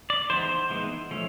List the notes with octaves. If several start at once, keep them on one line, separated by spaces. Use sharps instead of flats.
D5
E3 G#3 B3 D#4 C5
E3 G#3 B3 D#4
F3 A3 C#4